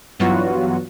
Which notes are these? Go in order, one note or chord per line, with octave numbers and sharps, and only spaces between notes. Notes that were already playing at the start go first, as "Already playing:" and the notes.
G2 E3 F#3 B3 F4 F#4